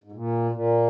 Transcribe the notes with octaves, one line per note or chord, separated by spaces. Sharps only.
G#2
A#2
A#2